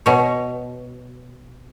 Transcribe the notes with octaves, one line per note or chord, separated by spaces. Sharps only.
B2 C#5